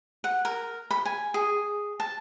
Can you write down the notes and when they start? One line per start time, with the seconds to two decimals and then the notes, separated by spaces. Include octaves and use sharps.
0.24 F#5
0.45 A#4
0.91 B5
1.06 G#5
1.34 G#4
2.00 A5